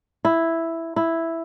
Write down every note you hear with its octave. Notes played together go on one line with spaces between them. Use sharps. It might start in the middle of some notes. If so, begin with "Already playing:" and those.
E4
E4